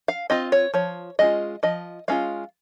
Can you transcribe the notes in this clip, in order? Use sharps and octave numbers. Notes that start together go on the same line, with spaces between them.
F5
C4 F4 D#5
C#5
F3 C#5
G#3 C#4 F4 D#5
F3 D#5
G#3 C#4 F4 F5